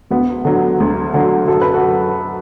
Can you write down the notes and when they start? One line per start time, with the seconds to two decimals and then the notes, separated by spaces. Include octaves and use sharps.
0.11 D2 B3
0.45 D3 F#3
0.80 D2
1.14 D3 F#3
1.48 F#2 A4
1.61 B4
1.74 F#4 A4
1.82 F#3